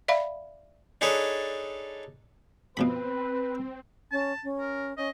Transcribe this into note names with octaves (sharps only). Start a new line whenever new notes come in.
D5 E5 F5 B5
D4 D#4 G#4 A4 B4 C#5
B2 F3 C4 B4 B5
C#4 A5
C#4
A#4
C#4 D#5